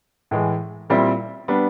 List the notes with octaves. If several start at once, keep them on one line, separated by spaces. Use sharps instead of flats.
A2 E3 G#3
A#2 G3 C4 E4
G3 B3 D4